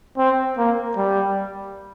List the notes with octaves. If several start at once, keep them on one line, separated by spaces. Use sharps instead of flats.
C4
A#3
G3